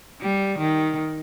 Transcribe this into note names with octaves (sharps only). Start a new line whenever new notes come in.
G3
D#3